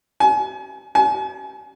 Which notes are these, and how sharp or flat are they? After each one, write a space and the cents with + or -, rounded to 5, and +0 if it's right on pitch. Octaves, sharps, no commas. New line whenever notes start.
G#5 +35
G#5 +40